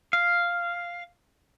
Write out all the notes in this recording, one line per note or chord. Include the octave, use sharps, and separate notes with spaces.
F5